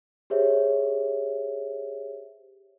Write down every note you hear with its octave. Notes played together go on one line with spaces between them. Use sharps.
G4 G#4 C5 C#5 E5